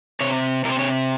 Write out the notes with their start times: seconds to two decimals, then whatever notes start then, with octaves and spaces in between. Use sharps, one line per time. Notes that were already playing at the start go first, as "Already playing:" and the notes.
0.21 C3 C#5
0.65 C3 A#4
0.72 C5
0.79 C#5